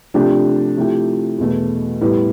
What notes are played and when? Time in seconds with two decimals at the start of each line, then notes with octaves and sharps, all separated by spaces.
0.14 C3 F3 A3 D4 G4
0.77 C3 F3 A3 E4 G4
1.38 E2 B2 A3
2.01 A2 G3 B3 E4